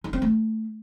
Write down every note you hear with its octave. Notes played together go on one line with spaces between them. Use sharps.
D#4
C4
A3